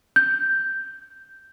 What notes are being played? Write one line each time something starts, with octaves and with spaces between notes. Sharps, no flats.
G6